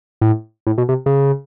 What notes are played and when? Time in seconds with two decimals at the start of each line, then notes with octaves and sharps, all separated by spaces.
0.21 A2
0.67 A2
0.78 B2
0.89 C3
1.06 C#3